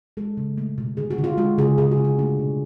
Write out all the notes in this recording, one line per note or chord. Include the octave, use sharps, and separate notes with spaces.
G#3 A4
C#3
A3
B2
D3 G#4
F#4
D3
F4
G#3 F#4
C#3 G#4
C#3 G#4
F#4
C#3
F#4
A3 D4
B2